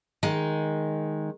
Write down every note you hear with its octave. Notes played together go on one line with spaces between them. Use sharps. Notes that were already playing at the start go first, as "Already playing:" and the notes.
D#3 G#3